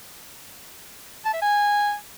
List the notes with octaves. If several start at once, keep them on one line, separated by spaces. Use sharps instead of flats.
A5
E5
G#5